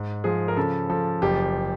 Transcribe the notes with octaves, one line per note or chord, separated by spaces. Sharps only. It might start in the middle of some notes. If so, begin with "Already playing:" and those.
Already playing: G#2
F3 G#4
A#4
C#3 A4
F3 A4
F#1 G4